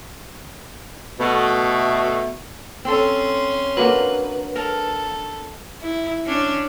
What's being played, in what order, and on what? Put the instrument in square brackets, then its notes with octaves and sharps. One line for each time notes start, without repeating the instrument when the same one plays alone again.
[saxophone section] B2 A3
[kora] C4 A4 [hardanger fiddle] C#4 C6
[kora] F#3 A#3 D4 [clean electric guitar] B4
[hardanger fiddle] A4 [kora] A#4
[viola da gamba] E4
C#4 D4